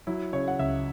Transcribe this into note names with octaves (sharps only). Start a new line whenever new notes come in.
F#3 E4
C#3 C#5
F#5
C#2 E5